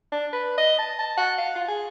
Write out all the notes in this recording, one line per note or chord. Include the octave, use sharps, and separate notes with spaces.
D4
B4
D#5
A5
A5
F#5
F5
F4
G#4